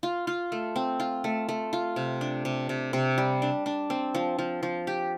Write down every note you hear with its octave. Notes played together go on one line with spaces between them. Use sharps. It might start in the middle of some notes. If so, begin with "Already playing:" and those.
F4
F4
A3
C4
F4
A3
A3
F4
C3
D4
C3
C3
C3
G3
D4
D4
C4
F3
F3
F3
G4